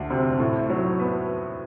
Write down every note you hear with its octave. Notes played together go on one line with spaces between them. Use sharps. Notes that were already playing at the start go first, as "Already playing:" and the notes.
Already playing: D2 A3
C3
A2
F#3
B3